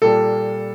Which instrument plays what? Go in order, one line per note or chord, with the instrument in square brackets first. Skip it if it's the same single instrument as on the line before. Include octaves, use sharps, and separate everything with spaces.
[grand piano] A#2 G3 A#3 A4